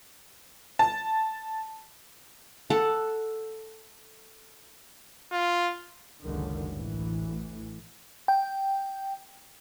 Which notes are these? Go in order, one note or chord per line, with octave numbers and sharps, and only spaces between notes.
A5
A4 F#5
F4
F#1 C#2 F#2 D3 D#3
A1 D2 A2 E3
G5